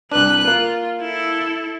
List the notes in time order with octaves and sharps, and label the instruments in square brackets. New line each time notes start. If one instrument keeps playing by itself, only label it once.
[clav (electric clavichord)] C2 D4 [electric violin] B4 F#6
[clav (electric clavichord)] A#3 [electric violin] F4
[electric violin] E4 A4